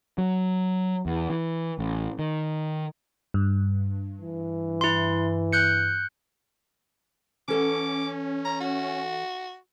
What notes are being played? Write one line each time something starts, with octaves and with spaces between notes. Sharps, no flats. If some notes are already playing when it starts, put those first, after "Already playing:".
F#3
E2
E3
A1
D#3
G2
E3
E4 C6
F#6 G6 C#7
E3 C#4 A4 F#5 D6
A#5
F#4